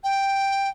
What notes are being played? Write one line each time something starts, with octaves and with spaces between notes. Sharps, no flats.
G5